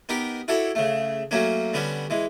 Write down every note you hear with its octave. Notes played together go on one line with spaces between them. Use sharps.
B3 D#4 G4 A#4
E4 F#4 A4 C#5 D5
C#3 A3
F#3 A3 A#3 C#4
D3 G3 B3 C#4
E3 G#3